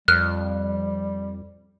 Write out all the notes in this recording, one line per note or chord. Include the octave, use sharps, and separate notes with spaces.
F2 G3 F6 F#6